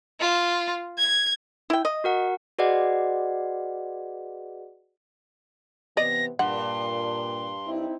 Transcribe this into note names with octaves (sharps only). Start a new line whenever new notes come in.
F4
G#6
E4 G5
D#5
F#4 A#4 F#5
F#4 G#4 B4 D5 D#5 F#5
C3 E3 B3 D5 D#5 A#6
G2 A#2 F#5 C6
C4 D#4 E4